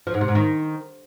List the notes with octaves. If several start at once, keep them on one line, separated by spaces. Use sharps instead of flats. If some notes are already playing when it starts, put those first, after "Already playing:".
F3
G#2
C3
G#2
D#3